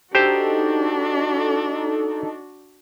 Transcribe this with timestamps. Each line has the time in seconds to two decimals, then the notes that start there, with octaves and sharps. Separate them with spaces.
0.15 D4 D#4 F#4 G4 A4 C5